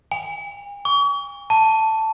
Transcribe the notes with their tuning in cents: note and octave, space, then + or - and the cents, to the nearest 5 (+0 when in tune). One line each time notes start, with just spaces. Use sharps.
G#5 -45
C#6 +40
A5 +5